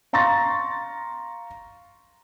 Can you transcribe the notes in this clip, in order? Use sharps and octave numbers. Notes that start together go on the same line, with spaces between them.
F5 A#5 C6 C#6 A6 A#6